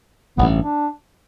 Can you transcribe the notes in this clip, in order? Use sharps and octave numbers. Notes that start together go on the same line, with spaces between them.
A1 G2 E3 B3
D4